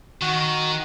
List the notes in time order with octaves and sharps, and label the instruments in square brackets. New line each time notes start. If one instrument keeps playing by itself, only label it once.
[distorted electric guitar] D#3 [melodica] F#4